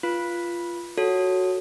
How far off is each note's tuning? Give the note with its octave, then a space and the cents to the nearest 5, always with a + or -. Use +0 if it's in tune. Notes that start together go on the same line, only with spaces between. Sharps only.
F4 -10 B4 -15
F#4 +0 A4 +0 C#5 +0